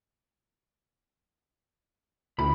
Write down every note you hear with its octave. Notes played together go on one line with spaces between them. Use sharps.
D2 E4 B5